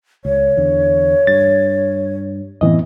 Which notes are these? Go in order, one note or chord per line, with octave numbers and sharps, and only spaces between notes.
C#2 C#5
E2 D3
G2 A6
F#2 A2 E3 B3 C4 D#5